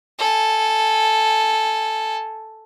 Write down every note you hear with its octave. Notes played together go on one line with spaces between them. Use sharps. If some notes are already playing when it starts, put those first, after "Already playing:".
A4 G#5